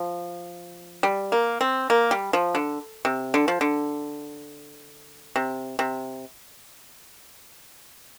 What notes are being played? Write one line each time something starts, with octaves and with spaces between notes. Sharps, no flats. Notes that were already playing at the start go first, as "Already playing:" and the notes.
Already playing: F3
G3
A#3
C4
A#3
G3
F3
D3
C3
D3
F3
D3
C3
C3